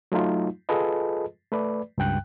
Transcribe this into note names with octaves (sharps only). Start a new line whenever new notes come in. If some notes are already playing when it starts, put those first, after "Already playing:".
F#3 A3 D#4 F4
F4 G#4 A4 B4 D#5
A3 B4 D5
C#2 G2 G5 F#6